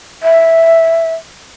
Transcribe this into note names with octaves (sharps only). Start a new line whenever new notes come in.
E5